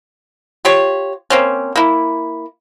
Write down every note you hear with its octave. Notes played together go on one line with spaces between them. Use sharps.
F4 G4 C#5
A#3 C4 C#4
A#3 E4